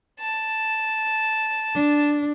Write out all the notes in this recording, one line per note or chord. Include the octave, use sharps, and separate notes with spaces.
A5
D4